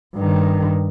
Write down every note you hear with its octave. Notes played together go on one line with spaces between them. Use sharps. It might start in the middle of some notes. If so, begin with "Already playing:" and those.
G2 D#3